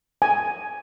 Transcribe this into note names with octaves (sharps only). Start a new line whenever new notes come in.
G#5